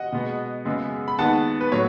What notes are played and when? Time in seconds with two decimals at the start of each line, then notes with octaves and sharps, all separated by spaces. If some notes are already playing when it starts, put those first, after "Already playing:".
Already playing: D#5 F#5
0.12 B2 G#3 B3
0.65 F#2 C#3 G#3 B3
1.08 B5
1.19 D#2 D#3 G#3 B3 F#5 A5
1.61 B4
1.72 A2 F#3 B3 C#5